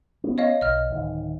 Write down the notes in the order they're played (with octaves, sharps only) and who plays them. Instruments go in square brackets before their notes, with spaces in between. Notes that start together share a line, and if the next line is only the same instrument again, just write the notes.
[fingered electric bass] B3 C#4
[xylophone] C#5 D#5 F5
[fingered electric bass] B1 [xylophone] D#5 F6
[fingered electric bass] D1 D#3